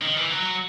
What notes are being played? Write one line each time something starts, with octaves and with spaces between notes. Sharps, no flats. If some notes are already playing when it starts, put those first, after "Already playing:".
D#3
E3
F#3